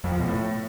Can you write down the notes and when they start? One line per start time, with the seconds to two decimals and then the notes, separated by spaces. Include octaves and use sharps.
0.04 F2
0.12 F3
0.20 B2
0.28 A2